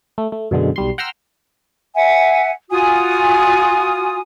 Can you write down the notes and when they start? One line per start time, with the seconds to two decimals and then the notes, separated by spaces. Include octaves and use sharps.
0.18 A3
0.32 A3
0.51 F#2 B2 D3 G#3
0.76 B1 G3 C6
0.98 F#5 G5 A#5 C6 E6 F6
1.95 E5 F#5 G#5
2.70 F4 F#4 G#5 D#6